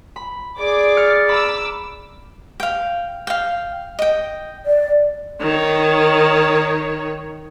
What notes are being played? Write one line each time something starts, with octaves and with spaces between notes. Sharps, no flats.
B5
G#4 D5 D6
F6 A6 C#7
A#5 B5 D6 E6
F5 G5
F5 G5
D#5 G5
D5
D#3 C#5